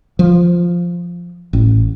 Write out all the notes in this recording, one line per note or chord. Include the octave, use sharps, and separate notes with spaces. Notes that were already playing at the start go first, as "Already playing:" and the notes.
F3
A1